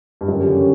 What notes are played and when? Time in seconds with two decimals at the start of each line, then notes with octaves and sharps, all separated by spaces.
0.21 G2
0.28 F#2 D3 F#3 C#4 G4 A#4
0.48 C#3